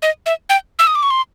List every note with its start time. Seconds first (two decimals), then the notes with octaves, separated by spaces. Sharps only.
0.02 D#5
0.26 E5
0.50 G5
0.79 E6
0.87 D#6
0.95 D6
1.03 C#6
1.11 C6